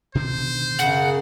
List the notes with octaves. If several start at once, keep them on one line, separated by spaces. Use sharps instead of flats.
B2 D3 D#3 C5
F#2 C#3 G#4 F#5